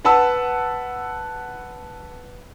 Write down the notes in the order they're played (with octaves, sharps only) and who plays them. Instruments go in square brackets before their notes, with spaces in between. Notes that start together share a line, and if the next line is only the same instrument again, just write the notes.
[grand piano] B4 F#5 A5 B5 E6